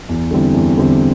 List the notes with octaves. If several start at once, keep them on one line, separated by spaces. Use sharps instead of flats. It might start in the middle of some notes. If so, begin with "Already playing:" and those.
E2
D3 G3 C4 E4
E2
D3 G3 C4 E4